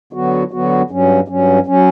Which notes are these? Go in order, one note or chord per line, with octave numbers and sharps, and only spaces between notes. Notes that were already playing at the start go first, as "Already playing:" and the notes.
D3 F#3 B3 F#4
D3 F#3 B3 F#4
G2 F#3 C#4
G2 F#3 C#4
F#3 C#4